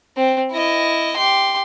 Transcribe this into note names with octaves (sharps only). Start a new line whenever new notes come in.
C4
E4 D#5
G4 C6